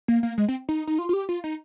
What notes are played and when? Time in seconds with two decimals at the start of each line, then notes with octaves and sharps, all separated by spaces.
0.08 A#3
0.23 A#3
0.38 G#3
0.48 C4
0.69 D#4
0.87 D#4
0.99 F4
1.09 F4
1.13 G4
1.29 F4
1.44 D#4